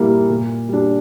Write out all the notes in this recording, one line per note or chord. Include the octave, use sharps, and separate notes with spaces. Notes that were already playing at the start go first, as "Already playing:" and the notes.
Already playing: A#2 G3 A#3 E4
A#2
G3 D4